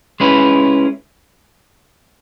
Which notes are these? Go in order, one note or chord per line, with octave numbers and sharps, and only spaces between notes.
G#3 C#4 E4 B4